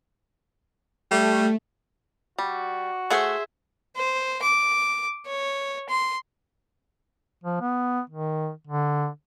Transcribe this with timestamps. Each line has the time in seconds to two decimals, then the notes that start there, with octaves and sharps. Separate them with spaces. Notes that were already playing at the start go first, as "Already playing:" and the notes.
1.11 G3 A3
2.39 G3 F#4
3.11 A3 G#4 C5 E5 F#5
3.96 C5
4.42 D6
5.26 C#5
5.89 C6
7.44 F3
7.61 B3
8.10 D#3
8.67 D3